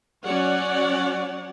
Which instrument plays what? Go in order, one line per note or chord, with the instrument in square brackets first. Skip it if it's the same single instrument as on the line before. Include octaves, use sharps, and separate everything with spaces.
[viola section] F#3 C#4 C#5 D5 F#5